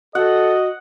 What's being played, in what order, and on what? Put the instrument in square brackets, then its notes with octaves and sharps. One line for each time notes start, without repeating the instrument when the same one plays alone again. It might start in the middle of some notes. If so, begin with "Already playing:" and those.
[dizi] F#4 [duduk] A4 [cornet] D#5 [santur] F#5